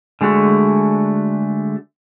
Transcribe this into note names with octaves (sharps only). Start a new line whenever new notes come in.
D3 G#3 A3 F#4